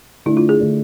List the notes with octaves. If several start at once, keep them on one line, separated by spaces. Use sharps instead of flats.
D3 A3 D4 E4
F4
G#4
D3 A3 D4